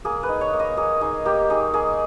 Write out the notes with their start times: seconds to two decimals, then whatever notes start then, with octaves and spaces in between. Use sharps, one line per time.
0.05 A#3 G#4
0.23 B4
0.29 D#4
0.41 C#5
0.53 A#3
0.59 D#5
0.77 A#3 G#4
1.01 D#4 G#4
1.25 A#3 G4
1.50 D#4 G#4
1.74 A#3 G#4